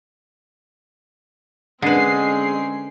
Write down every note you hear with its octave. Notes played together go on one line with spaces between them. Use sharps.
D3 G#3 C4 C#4 B4 C7